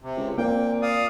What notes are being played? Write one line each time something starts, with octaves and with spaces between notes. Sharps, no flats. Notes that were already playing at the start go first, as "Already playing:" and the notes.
C3
C#2
A#2 A#3 C4 G5
D5 F5 D#6